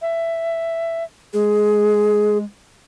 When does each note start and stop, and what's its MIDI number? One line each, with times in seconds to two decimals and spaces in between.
0.02 1.04 76
1.33 2.44 56
1.33 2.37 68